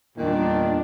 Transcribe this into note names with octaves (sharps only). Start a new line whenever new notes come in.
E2 A#2 D#3 G3 D4